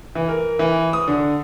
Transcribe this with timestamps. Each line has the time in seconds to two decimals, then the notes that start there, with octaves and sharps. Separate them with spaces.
0.15 E3
0.29 A#4
0.59 E3
0.93 D#6
1.08 D3